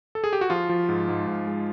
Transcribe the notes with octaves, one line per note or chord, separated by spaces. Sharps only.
A4
G#4
G4
F#4
F3 F4
F3
G#2
G#2
G#2
G#3